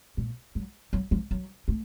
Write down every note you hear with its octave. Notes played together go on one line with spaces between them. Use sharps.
A#2
F#3
F#3
F3
F#3
A3